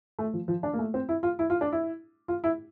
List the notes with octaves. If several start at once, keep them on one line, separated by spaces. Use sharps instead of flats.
A3
F3
F3
D4
A#3
A3
C4
E4
F4
E4
F4
D4
E4
F4
E4